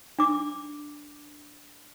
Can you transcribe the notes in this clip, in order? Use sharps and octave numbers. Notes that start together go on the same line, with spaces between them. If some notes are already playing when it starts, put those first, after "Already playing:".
D4 D6